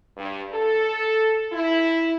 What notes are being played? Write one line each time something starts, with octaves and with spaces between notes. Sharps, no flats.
G2
A4
E4